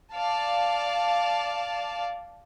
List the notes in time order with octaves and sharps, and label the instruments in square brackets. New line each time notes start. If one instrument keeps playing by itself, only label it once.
[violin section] D5 F5 A5